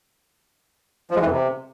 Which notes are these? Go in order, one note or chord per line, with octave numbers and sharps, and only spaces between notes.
F3
G#3
E3
F2
C3